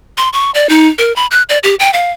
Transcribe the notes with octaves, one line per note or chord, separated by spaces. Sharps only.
C6
C#6
D5
D#4
A#4
B5
F#6
D5
G4
G5
F5